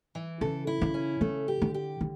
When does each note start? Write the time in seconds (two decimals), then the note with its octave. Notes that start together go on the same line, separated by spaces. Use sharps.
0.15 E3
0.41 C#3 A4
0.67 E4
0.81 C#3
0.94 C#4
1.21 C#3 A3
1.48 G4
1.62 D3
1.74 G4
2.01 D3